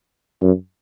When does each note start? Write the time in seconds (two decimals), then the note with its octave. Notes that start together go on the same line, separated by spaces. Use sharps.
0.42 F#2